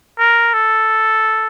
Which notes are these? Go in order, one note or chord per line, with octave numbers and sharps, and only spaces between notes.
A#4
A4